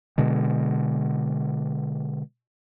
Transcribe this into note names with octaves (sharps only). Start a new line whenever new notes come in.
B2 D3 G#3